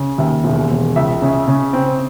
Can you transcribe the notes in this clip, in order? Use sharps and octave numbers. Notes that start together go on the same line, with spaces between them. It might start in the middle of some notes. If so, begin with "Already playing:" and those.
Already playing: C#3
D#2 E5
E1
E1
C#2 E5
C#3
C#3
C4